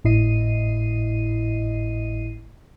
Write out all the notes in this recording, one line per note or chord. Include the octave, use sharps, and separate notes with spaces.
G#1 A2 E4 D#5 C7 D#7